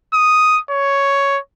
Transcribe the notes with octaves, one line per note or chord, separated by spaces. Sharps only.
D#6
C#5